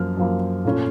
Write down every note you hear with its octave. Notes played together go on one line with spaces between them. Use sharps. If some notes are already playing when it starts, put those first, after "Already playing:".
Already playing: F#2 F3 A#3 F6
F#2 F3 A#3
A#2 A3 C#4 F4